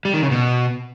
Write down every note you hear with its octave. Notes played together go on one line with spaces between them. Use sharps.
G3
D#3
C#3
B2